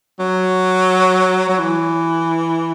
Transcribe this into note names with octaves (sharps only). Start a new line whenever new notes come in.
F#3
F#3
E3